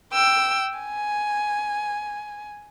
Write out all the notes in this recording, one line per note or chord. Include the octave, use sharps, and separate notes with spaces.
G5 E6
G#5